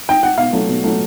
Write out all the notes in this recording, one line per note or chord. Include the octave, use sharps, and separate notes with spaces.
G5
F#5
B2 F5
F#3 A3
B2
F#3 A3